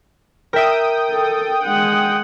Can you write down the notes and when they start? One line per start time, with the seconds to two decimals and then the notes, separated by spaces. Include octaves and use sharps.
0.53 A#4 E5 G5 D#6
1.10 A4
1.64 G#3 F#5